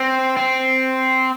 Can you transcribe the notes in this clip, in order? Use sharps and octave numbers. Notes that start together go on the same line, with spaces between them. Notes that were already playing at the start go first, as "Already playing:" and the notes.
Already playing: C4
C4